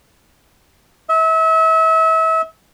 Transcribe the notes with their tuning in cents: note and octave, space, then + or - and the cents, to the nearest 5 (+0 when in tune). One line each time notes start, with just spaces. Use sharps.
E5 -35